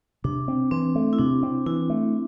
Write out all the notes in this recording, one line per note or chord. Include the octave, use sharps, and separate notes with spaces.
C3 D4
C4
E3 C4
A3
E4
C3 D4
C4
E3 E4
A3